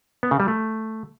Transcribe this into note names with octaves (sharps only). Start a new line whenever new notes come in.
B3
C#3
G3
A3